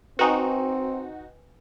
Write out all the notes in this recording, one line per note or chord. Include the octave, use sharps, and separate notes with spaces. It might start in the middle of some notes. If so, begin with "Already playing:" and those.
C4 D#4 F#4 B4 G5 G#5